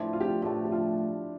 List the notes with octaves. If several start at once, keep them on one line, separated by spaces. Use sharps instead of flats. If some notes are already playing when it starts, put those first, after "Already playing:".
Already playing: A2 F3 A3 D4 E4
F4
G4
F4
A2 F3 A3 D4 G4
G4
F4